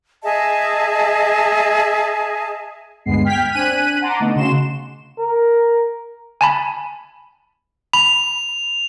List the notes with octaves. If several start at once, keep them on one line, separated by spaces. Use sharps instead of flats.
G#4 D#5 E5 A5
D2 G2 G#3 B3 C7
G5 F6 G6 G#6 B6
C4 D4 G#5 F#6 B6 D#7
F#5 A5 A#5 C6 D6
D3 A3 B3 D#4
C#3 F#4 C6 E7
A#4
G#5 A5 B5
B5 F7